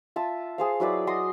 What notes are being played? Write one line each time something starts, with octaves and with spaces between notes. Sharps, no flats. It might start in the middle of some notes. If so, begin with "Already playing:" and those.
F4 E5 A5
G#4 C5 F5
F#3 E4 B4 D5
F#4 D#5 C6 D#6